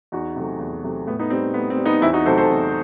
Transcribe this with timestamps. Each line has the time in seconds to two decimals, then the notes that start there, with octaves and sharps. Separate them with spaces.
0.12 E2 D#4 F#4
0.36 C3 F#3 A3
0.60 E2
0.84 C3 F#3 A3
1.07 A2 B3
1.19 B3 D#4
1.30 G3 C4
1.54 A2 B3
1.70 C4
1.78 G3
1.85 B3 D#4
2.01 E2 C4 E4
2.13 D#4 F#4
2.25 C3 F#3 A3 A4 C5
2.38 A4 C5
2.50 E2